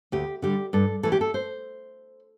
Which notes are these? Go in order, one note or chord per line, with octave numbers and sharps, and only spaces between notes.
D2 G4
D3 G3 G4
G2 A4
E3 A3 A4
G4
A4
C5